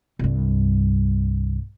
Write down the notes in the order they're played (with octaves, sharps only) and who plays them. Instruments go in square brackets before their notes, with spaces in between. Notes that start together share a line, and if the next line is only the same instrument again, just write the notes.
[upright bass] C2 G2